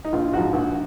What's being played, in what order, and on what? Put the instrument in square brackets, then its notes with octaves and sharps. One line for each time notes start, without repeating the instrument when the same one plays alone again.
[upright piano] D#4
A#1 F4
F4
G#2 F3 F#4
A#1